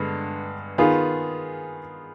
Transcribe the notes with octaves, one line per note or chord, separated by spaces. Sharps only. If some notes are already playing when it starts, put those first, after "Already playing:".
Already playing: G2 D3 G#3 B3
D#3 B3 F4 G#4